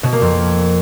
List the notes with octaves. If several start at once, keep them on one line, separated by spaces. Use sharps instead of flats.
B2
A#3
F2